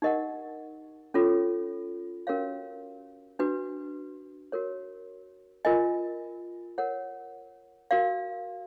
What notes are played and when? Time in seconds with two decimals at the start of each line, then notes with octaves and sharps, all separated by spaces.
0.02 D#4 G4 A#4 D#5 F#5
1.14 C#4 F4 A4 C#5
2.27 C#4 F#4 A#4 C#5 F5
3.39 D4 F#4 B4
4.52 F#4 A#4 C#5
5.65 F4 A#4 D#5 G#5
6.78 A#4 C#5 F#5
7.91 F#4 A#4 D5 F5